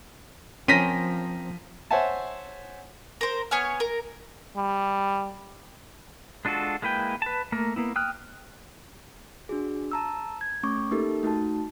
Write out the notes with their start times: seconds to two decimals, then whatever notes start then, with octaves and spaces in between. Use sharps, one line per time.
0.68 F3 C4 C#4 A#4 C5 A#6 B6 D#7
1.91 C5 C#5 E5 F#5 G#5 A5
3.21 A#4 C5
3.51 B3 C#5 G#5 F6
3.80 A#4
4.56 G3
6.45 G#3 D4 F4 F#4 A4
6.82 G#3 A#3 E4 B4 G5
7.22 B4 A5
7.52 A3 A#3 A#4
7.76 A#3 B3 E4
7.96 G5 D#6 F6 F#6
9.49 D4 F#4 G#4
9.92 A5 A#5 E6
10.41 G#6
10.63 A3 C#4 C#6 D6
10.91 A#3 D#4 G4 A4 A#4
11.23 A3 D#4 F#4 A5